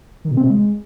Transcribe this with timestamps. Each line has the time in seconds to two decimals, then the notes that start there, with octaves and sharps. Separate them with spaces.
0.25 D#3
0.31 B2
0.37 C4
0.44 B2
0.50 G#3